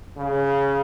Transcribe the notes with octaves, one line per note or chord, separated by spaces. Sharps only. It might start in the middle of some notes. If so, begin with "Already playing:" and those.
C#3